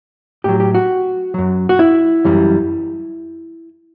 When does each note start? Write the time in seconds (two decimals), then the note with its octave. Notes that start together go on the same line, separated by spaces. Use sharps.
0.44 A2 F#3 G4
0.60 G4
0.74 F#4
1.34 F#2 F#3
1.69 F#4
1.79 E4
2.25 F#2 E3 G3